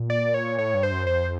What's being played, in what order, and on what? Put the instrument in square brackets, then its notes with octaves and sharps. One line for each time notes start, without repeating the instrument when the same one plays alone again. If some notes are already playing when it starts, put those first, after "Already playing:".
Already playing: [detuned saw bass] A#2
[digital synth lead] D5
C#5
[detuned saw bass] A2 [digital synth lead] C#5
[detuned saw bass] G2
[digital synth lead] C5
[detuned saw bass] F#2
[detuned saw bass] F2 [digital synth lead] C5